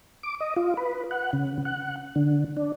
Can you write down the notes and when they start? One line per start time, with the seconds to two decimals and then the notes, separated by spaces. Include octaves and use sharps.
0.23 D6
0.40 D#5
0.56 F4
0.77 B4
1.11 F#5
1.33 C#3
1.65 F#5
2.16 D3
2.57 D4